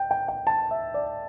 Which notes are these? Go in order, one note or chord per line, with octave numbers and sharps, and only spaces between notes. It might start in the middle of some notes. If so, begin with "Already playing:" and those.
Already playing: G5
G5
G5
A5
E5
D5